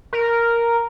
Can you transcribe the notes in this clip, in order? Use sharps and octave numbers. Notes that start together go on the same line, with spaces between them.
A#4